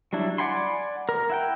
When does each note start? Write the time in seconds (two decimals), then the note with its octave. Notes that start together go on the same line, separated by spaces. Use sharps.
0.13 F#3 G3 D4 E4
0.38 D5 F#5 G#5 B5 C6
1.09 A#4
1.30 E4 F#5 G5